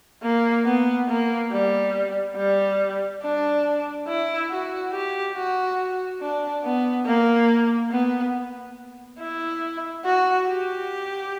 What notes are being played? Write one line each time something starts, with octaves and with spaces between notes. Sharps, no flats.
A#3
B3
A#3
G3
G3
D4
E4
F#4
G4
F#4
D4
B3
A#3
B3
E4
F#4
G4